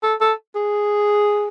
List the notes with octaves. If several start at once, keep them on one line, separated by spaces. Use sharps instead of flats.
A4
A4
G#4